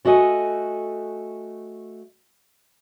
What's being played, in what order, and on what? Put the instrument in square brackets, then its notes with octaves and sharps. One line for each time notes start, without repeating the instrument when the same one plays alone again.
[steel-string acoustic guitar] A3 F#4 A4 D#5 F#5 G#5